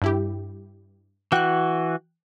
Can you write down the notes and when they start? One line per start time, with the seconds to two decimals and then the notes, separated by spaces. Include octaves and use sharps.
0.02 G2 E4 G4
1.32 E3 F#4 G5 F#6